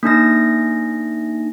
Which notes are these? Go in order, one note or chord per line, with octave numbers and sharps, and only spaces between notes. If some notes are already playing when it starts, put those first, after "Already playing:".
A#3 D4 D#4 A#6